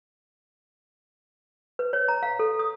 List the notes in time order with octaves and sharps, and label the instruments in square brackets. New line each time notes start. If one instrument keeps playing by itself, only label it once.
[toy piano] B4
C#5
A#5
F5
A4
D#6